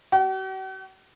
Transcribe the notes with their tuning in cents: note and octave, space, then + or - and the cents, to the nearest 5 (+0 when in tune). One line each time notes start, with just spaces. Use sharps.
F#4 +45